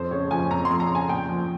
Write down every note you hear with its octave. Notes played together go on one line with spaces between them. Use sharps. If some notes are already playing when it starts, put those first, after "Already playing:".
Already playing: F2 C5
C#3 C#5
F3 G#5
F2 A#5
C6
F2
A#5
C#3
G#5
A#2 G5
F3